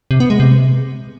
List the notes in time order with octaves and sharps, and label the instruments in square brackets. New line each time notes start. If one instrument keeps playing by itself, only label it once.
[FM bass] C3
B3
G#3
C3